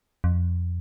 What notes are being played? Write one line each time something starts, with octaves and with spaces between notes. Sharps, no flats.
F2